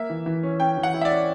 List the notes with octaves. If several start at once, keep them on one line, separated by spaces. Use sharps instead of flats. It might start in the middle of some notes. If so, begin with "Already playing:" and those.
Already playing: A#3 E5
E3
E3
C#4
C#4 G5
E3
F#5
E4
E5
D5
C#4